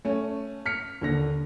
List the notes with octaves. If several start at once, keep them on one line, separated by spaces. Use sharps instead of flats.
A3 C#4
F6 B6 C#7
D#2 D3 A#6